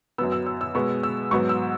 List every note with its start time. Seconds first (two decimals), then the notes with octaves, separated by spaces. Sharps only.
0.18 F#2 F#3 B3 E6
0.32 E6
0.46 E6
0.61 E6
0.75 B2 G#3 B3 C#6
1.03 E6
1.31 G#2 F#3 B3 C#6
1.49 E6